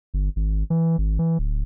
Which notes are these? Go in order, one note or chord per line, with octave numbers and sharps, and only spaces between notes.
G1
G#1
E3
G#1
E3
D1